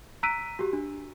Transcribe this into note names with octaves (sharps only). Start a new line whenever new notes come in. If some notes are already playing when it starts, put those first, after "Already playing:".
A#5 E6 F#6 B6 D7 D#7
F#4 G4
D4